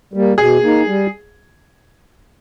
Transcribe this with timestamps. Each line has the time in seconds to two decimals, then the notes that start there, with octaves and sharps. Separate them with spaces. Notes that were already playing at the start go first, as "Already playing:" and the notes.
0.14 G3 A#3
0.38 B2 G#4
0.62 A#3 D#4
0.87 G3